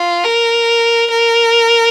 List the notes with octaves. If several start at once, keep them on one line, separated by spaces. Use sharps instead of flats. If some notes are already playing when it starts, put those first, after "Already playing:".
Already playing: F4
A#4
A#4